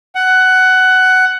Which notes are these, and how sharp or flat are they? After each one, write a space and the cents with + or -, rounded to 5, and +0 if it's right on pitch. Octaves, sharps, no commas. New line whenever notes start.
F#5 +15